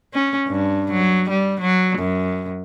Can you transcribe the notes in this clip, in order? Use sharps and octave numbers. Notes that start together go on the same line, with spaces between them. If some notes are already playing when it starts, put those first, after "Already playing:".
C#4
G2
F#3
G3
F#3
F#2